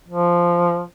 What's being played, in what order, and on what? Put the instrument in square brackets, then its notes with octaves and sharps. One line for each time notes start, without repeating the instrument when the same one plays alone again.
[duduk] F3